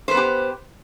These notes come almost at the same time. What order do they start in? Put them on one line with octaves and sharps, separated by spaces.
C5 B4 B3 G4